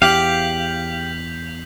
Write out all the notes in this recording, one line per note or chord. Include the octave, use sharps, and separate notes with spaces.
E2 G4 F5 G6 B6 F#7